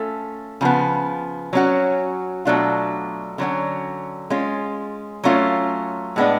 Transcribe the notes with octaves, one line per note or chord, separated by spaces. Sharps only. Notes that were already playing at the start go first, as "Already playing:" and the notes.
Already playing: A3 C#4 F4 A4
C#3 F3 B3
F#3 C#4 F#4
B2 F#3 A3 D4 F4
D3 F#3 C#4 F#4
G#3 C#4 F4
F#3 A3 C#4 F4
A2 G#3 B3 D4